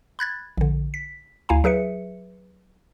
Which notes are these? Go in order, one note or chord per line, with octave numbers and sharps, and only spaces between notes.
B5 F#6 G#6 A6
A#1 D3
B6
D2 E4 F5 G#5 A#5
F#3 G#4 B4 E5 C#7